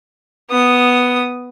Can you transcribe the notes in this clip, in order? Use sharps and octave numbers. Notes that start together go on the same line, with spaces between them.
B3 D#6